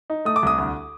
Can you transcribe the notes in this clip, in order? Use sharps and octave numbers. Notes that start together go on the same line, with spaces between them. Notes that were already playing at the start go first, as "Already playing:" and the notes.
D#4
A3 D#6
D6
C2 D#6
D2